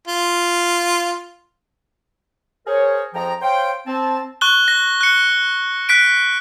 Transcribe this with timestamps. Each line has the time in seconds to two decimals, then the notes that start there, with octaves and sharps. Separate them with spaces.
0.08 F4
2.67 G#4 A#4 C5 C#5
3.14 F2 F3 G#4 G5 A#5
3.42 C5 C#5 F5 G5
3.87 C4 A5
4.41 C#6 F#6 G7
4.68 A#6
5.01 F#6 C#7
5.89 F#6 B6 D7